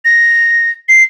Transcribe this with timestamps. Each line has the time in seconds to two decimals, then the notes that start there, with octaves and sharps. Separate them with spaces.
0.05 A#6
0.89 C7